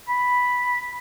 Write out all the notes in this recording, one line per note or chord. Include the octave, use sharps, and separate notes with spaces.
B5